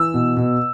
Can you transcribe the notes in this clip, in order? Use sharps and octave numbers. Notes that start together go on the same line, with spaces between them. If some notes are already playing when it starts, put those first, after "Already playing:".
Already playing: E3 E6
B2
B2